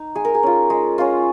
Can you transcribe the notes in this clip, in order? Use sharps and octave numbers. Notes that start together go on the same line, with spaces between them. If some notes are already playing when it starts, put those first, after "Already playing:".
Already playing: D#4
G#3 G#4
A#4
G#4
C#4 F4
G#3
C#4 F4